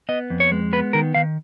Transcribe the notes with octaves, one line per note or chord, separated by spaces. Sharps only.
B3 D#5
F2
C#5
G#3
B3 B4
D#3 A#4
D#3 F5